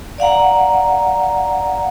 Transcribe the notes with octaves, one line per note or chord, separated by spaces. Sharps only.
D5 F5 F#5 A#5